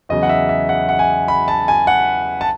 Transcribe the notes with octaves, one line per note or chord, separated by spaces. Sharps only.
E2 C#3 F#3 D#5
F#5
E5
E5
F#5
F#5
G#5
B5
A5
G#5
F#5
A5